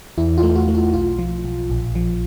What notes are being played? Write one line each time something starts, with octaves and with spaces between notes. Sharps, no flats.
E2 E4
F4
A3
F#4
A3
F4
B1 F4
F3
B1
A#1
F3